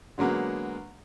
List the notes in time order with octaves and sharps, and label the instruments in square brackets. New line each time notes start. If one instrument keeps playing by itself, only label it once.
[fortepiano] D3 F#3 G#3 A#3 B3